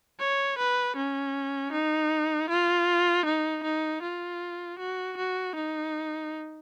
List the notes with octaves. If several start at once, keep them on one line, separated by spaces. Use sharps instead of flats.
C#5
B4
C#4
D#4
F4
D#4
D#4
F4
F#4
F#4
D#4